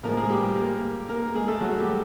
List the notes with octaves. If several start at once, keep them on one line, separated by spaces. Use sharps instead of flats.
A2 F3 G#3 A#3 A#4
G#3 G#4
G3 G4
A#3 A#4
A#3 A#4
G#3 G#4
A3 A4
F#3 F#4
G3 G4